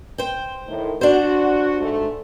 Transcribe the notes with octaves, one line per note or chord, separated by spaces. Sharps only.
C5 G5
A2 D#3
D4 F#4 C5
G#2 A3